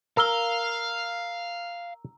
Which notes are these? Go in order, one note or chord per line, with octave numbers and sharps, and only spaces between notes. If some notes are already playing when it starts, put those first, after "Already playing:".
A#4 F5 A#5 E6 G7